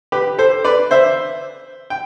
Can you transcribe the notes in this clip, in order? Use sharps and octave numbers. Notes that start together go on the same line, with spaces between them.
G4 B4
A4 C5
B4 D5
C5 E5
G5